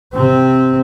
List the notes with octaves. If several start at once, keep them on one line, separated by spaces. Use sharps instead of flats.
C3 C4